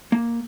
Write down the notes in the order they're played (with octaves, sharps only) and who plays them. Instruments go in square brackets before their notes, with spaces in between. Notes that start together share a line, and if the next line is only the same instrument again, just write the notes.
[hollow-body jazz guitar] A#3